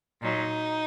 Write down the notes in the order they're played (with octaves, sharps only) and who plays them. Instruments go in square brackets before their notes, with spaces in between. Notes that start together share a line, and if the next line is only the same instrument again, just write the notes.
[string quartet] A#2 F#3 D#4